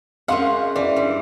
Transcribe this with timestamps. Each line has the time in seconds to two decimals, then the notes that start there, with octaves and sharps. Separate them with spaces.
0.28 F#2 G#3 F5 F#5 C6
0.76 E3 D5
0.96 G2